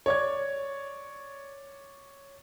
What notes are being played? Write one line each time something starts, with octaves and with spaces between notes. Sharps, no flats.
C#5 D5 G#6